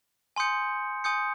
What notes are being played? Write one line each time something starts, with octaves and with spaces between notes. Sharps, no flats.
G#5 C6 D#6 G6 C#7
G#5 C6 D#6 G6 C#7